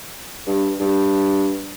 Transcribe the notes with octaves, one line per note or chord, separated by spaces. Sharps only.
G2
G2